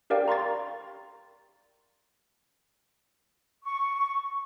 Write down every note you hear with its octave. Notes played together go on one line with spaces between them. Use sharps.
G4 A#4 D5 F5 G5
A#5 C6 C#6 A6
C#6